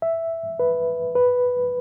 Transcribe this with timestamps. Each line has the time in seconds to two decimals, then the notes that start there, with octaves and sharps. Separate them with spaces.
0.02 E5
0.59 B4
1.15 B4